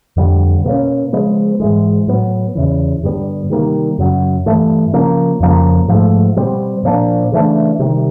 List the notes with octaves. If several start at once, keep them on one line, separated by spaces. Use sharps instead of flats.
F2 D3 G3
B2 F#3 A#3 C#4
C#3 F3 G#3 B3
G#2 E3 G#3
A2 F#3 B3
E2 C#3 E3
G2 D3 G3 B3
C3 D#3 G3 A#3
F#2 C#3 F#3
G2 E3 A3
C#3 F3 A#3
F2 C#3 F3 A#3
G#2 F3 A3
B2 G3 C4
A#2 F3 A#3 D4
C#3 E3 A3 D4
C3 D#3 G3